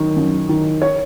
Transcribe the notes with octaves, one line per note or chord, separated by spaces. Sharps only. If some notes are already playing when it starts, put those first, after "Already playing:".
Already playing: F#2 D#3
F#2
D#3
C#5